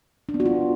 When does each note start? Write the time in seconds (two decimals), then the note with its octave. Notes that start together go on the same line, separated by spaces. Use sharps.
0.29 D4
0.34 B3
0.40 F#4
0.45 F4